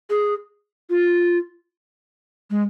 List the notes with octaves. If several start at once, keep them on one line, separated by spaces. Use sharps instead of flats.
G#4
F4
G#3